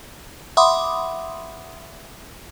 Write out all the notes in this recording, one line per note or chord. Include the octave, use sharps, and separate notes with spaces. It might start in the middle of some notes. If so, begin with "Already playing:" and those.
E5 F#5 B5 C6 D6 D#6